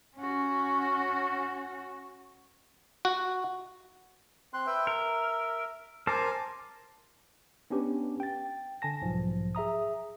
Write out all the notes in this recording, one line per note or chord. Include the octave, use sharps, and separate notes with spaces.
C#4 F#4
F#4
C4 C6 F#6
B4 E5 G5
A#4 E5
A#4 C5 G#5 A5 D6
B3 C#4 D4 G4 B4
G5 A6
D3 G#5 A5 A#6
B1 G#2 F3
G#4 E5 A#5 D#6